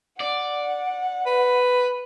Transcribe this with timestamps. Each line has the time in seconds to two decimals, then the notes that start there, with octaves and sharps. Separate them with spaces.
0.20 D5 F#5
1.26 B4